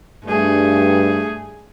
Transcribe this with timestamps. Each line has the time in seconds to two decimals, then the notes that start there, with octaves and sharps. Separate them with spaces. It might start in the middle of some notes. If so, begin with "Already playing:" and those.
0.25 G2 A3 G#4